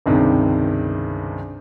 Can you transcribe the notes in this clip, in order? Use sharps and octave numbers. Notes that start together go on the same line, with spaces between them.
C#2 G2 C3 D#3